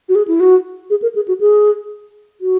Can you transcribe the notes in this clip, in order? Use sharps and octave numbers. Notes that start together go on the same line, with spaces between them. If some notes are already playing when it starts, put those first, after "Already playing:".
F#4
G#4
E4
F#4
G#4
A#4
G#4
F#4
G#4
F#4